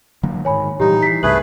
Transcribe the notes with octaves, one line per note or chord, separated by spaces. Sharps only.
D3 F#3 A#3
G#2 D#3 C#5 G#5 B5
A#2 E3 G3 D#4 G4
E3 B6 C7
C2 G2 C3 A3 G#4 B4 G#5 F#7